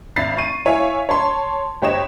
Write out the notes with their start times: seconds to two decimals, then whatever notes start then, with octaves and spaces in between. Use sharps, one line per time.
0.16 G#1 E5 B5 A6 C7
0.37 C#6 D#7
0.65 E4 C#5 E5 F5 G#5
1.09 C#5 A5 C6
1.82 G1 G4 C5 C#5 D#5 E7